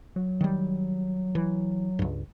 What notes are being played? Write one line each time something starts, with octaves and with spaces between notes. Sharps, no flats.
F#3
D#3 G3
E3
C#2 G2